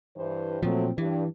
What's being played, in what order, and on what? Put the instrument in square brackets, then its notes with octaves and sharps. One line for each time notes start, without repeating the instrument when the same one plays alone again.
[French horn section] G2 E3 C5
[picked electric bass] A#2 F3 [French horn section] F#3 A3 C4
[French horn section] G2 [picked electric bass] E3